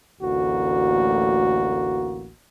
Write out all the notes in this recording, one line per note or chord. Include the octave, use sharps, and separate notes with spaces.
A1 D2 A#3 F#4